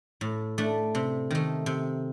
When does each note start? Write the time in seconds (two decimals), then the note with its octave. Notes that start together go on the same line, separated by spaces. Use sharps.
0.21 A2
0.58 A3 D4
0.95 C3
1.31 D#3 A3
1.66 C3